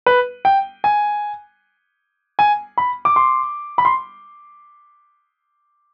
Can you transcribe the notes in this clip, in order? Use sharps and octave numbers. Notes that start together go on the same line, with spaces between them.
B4
G5
G#5
G#5
B5
D6
C6
B5
C6